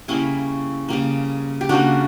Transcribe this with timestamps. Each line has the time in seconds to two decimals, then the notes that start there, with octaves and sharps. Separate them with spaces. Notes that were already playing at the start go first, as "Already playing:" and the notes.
0.08 C#3 G3 A#3 C#4 E4
0.89 C#3 G3 A#3
1.61 G4
1.69 C#3 G3 A#3 D4 F#4